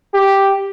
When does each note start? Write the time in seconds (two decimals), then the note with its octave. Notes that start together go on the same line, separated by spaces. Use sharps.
0.14 G4